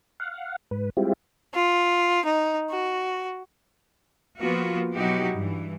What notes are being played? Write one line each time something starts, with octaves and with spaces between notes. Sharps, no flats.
F5 F#5
G#2 B4
G3 G#3 C4 E4 F4 G4
F4
D#4
F#4
F3 A#3 B3 F4 F#4
B2 F#3 D#4 E4 F#4 G4
G2 E3